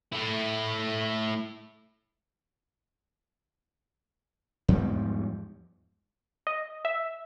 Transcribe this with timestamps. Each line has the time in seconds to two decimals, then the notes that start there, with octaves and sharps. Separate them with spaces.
0.12 A3 E4
4.68 E2 G#2 F3 G3
6.47 D#5
6.85 E5